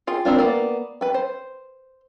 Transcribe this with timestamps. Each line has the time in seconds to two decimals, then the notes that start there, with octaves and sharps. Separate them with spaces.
0.07 F4 G#4 G5
0.25 D#3 C4 D4 F4
0.38 A#3 B3 A#4 D5 G5
1.01 B4 G5
1.14 C5